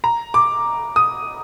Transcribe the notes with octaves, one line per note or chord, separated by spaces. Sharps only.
A#5
D6
D#6